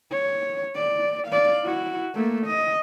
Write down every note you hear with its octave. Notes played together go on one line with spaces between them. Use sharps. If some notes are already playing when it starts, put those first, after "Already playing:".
C#5
D5
D5 F5
E4 F#4
A3 A#3
D#5